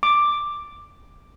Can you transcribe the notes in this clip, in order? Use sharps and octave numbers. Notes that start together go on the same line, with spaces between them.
D6